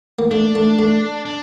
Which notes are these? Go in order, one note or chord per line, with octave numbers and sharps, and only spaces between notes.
A#3
A3 D4
A3
A3
D4